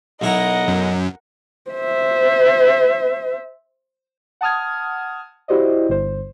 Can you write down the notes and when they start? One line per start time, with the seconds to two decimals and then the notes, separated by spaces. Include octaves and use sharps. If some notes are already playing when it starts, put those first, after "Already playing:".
0.21 B1 E4 A#4 D#5 F#5 A#5
0.68 F#2
1.70 C5 E5
4.41 F#5 A5 D#6 F6 G#6
5.48 E4 F#4 G4 C5 D5 D#5
5.89 G1 C5